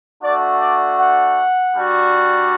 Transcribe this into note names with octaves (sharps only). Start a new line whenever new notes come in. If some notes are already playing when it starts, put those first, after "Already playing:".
A3 D4 F#4 D5
D5
F#5
G3 D4 F#4